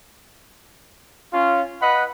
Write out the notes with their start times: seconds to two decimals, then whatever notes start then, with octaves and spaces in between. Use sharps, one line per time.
1.33 C#4 F4
1.82 B4 D#5 F#5 B5